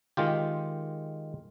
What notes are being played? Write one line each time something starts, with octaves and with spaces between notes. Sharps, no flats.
D#3 G#3 F4 G4